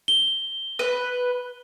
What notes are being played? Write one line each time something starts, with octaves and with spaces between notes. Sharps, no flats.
G7
B4